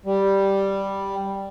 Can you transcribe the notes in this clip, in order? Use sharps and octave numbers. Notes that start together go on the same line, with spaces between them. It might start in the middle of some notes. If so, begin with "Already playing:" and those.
G3